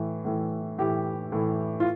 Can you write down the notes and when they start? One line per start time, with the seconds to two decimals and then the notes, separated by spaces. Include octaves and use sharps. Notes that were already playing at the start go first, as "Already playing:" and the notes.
Already playing: A2 E3
0.25 A2 E3
0.78 A2 E3 G4
1.32 A2 E3
1.80 F4